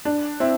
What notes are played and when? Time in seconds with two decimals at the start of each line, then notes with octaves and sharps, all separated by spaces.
0.05 D4
0.40 C4 E4